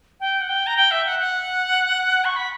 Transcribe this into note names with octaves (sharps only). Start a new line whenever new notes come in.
G5
F#5
G5
A#5
G5
E5
F#5
F#5
C#6
B5